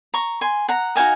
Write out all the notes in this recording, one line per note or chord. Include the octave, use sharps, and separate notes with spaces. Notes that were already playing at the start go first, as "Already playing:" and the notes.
A#5 C#6
G#5 C6
F#5 A#5
D#4 F#4 C5 D#5 F5 G#5